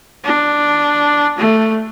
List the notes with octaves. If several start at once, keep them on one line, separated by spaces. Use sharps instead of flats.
D4
A3